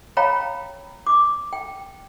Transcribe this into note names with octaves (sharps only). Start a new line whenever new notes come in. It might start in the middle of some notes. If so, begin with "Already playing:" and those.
C#5 F5 G5 A#5 B5
D6
G5